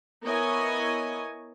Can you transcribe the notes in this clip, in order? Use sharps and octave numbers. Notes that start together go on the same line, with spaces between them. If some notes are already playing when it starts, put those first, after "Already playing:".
B3 E4 A#4 C#5 D#5 G#5